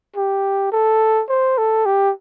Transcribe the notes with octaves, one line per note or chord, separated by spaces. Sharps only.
G4
A4
C5
A4
G4